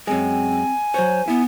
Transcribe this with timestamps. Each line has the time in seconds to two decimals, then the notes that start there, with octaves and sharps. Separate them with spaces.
0.07 F#2 G#3 C4 G#5
0.94 F#3 C5 C#5
1.28 B3 E4